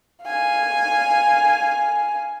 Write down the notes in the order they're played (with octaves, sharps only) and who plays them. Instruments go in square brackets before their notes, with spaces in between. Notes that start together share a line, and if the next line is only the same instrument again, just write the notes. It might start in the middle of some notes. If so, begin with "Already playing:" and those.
[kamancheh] F5 G#5